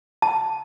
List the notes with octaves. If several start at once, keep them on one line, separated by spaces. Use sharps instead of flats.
A5